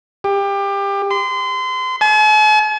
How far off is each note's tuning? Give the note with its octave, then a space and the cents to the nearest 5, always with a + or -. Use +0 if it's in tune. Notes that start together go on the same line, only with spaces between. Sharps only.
G4 +25
C6 -30
G#5 +45